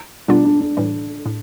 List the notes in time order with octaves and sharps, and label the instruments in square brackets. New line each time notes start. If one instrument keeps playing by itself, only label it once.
[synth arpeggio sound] B2 G3 B3 F4 [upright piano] D4
[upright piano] D4
D4
[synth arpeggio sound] A2 E3 G3
A2